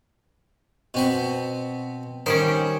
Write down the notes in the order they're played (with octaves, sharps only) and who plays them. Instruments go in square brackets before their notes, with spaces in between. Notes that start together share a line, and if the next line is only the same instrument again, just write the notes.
[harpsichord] B2 C4 B5
[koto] D#3 G3 C#4 [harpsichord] C5